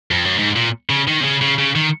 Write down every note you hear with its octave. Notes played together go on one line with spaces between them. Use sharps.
F2
F#2
G#2
A#2
C#3
D#3
C3
C#3
C#3
C#3
D#3